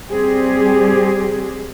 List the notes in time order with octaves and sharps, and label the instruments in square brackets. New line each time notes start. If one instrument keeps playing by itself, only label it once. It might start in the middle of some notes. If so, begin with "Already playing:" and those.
[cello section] G3 C4 G4 G#4